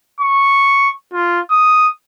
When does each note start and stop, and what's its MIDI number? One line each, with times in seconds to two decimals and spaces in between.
0.20 0.90 85
1.13 1.40 65
1.50 1.88 87